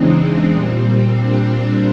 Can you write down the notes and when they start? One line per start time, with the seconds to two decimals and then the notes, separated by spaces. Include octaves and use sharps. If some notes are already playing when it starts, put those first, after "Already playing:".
Already playing: E2 C#3 E3 G#3 C4 D4 D#4
0.49 A#2 G3
1.15 D4
1.49 D4